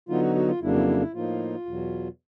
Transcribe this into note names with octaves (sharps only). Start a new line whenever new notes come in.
D3 F#3 B3 D#4 F4
F#4
F#4
F4
F2 C#3 F#3 A#3 D4 E4
E4
E4
E4
A2 F3 A#3 D#4 F4
E2 B2 F#3